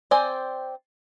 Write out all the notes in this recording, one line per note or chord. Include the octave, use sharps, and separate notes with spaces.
C4 C5 D5 G#5